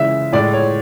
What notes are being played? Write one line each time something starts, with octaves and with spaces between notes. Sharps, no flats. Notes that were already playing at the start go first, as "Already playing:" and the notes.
Already playing: C#3 E3 G#3 E5
A2 G#3 D5
C#5